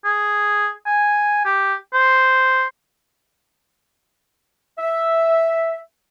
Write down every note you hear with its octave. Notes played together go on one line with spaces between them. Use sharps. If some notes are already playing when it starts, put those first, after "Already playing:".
G#4
G#5
G4
C5
E5